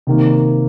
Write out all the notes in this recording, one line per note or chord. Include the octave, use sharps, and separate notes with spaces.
C3 D#3 A#3